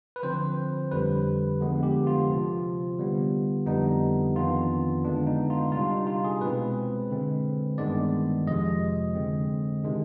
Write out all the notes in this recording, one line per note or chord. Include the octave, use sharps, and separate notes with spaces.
B4
D3 F3 C4 C5
F2 D3 G3 B4
D3 F3 G#3 B3
G4
F4
C3 F3 C4
D3 G3 B3
F2 D3 G3 B3 D4 D#4
F2 D#3 B3 D4 F4
D3 G#3 B3 D4
D#4
F4
C3 G3 D4 F4
D#4
F4
G#4
B2 G#3 C4 B4
D3 G#3 C4
G2 D#3 G#3 B3 D4 D5
F2 C3 F3 G#3 D#5
D3 G#3 C4
C3 D#3 G#3 D4